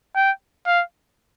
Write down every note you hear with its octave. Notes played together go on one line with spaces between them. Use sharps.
G5
F5